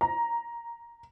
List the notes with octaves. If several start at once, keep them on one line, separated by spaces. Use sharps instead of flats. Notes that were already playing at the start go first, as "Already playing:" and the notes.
A#5